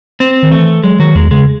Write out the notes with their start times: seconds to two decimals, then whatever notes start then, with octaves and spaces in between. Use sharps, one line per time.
0.20 C4
0.43 D#3
0.51 E3 A3
0.83 F#3 G#3
0.99 D#3 F#3
1.15 E2 G#3
1.31 C#3 G#3